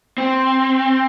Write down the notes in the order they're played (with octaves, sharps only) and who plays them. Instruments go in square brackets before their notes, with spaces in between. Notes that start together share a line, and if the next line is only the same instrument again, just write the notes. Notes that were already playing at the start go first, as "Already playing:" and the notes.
[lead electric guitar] C4